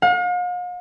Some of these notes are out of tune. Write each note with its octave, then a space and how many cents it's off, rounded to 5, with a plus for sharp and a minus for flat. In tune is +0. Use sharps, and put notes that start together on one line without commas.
F5 +45